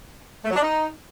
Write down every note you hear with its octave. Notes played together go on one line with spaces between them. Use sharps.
A3
F#3
D4
D#4